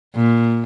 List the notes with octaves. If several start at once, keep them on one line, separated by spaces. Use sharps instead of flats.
A#2